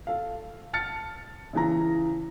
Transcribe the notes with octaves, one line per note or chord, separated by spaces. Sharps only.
A4 F5
A5 F6 A6 C#7
C#3 E3 A#5